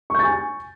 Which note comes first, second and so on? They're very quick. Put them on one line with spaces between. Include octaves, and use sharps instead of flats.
C#6 G6 A6 G#5